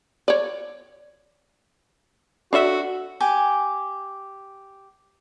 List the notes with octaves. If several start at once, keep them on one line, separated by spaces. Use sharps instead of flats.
C#5 D5
D4 F#4 A4 E5
G4 G#5 D6